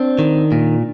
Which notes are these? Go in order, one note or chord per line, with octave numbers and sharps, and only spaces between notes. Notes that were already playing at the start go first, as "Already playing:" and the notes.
Already playing: C4 D4
D#3
A#2